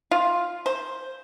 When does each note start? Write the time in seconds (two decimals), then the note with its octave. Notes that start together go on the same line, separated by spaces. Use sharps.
0.11 F4
0.66 C5